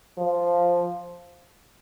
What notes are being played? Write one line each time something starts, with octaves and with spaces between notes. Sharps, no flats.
F3